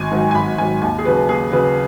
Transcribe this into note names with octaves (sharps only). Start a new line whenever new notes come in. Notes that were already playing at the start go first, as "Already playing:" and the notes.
Already playing: G#1 G#5
G#2 D#3 F#3
G#5
G#1 B5
G#2 D#3 F#3 G#5
D#2 G#5
G#4
C#3 F#3 B4
D#2 G#4
C#3 F#3 B4